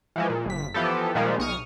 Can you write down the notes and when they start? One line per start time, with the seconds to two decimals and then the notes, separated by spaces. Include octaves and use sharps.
0.16 E3 F3 G#3
0.29 A#2
0.46 G1 B6
0.74 E3 F3 B3 G4 A4
1.15 A#2 D#3 F3 G3 G#3
1.38 B1 C#6 D#6 F6